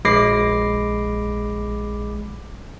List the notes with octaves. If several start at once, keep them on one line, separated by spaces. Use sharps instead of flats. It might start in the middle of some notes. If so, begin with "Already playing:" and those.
A#1 G#3 B5 D6 A#6 C7